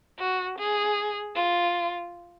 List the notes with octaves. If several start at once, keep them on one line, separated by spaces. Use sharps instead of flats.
F#4
G#4
F4